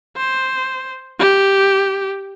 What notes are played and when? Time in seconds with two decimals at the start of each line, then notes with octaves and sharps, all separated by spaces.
0.17 C5
1.19 G4